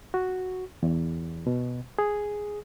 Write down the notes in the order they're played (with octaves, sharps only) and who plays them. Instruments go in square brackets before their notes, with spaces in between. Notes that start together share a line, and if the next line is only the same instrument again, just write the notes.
[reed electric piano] F#4
E2
B2
G#4